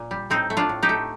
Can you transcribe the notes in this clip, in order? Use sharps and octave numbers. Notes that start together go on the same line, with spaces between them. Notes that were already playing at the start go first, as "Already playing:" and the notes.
Already playing: A#2
G3
A2 C4 D#4
A3
D4 F4
A2
D#4 G4
A3